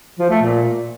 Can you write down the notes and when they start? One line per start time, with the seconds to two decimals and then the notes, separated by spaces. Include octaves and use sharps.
0.19 F3
0.30 A3
0.42 A#2